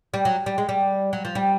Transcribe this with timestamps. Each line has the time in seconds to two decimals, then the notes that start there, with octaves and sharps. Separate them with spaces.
0.14 G3
0.25 F#3
0.46 G3
0.58 G#3
0.69 G3
1.13 F#3
1.25 F3
1.35 G3